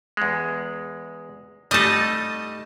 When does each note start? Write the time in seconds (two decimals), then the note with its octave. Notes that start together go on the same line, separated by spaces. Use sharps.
0.17 E2 G#3
1.71 G3 A3 D#4 D#5 A5